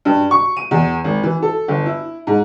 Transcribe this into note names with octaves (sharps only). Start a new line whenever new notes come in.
G2
C#6
D#7
E2
G#1
E3
A4
G1
E4
G#2